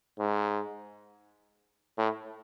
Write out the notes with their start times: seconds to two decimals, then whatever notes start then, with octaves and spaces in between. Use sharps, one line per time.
0.19 G#2
1.98 A2